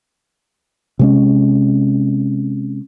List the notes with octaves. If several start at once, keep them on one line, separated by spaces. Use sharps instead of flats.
C3 G#3 C#4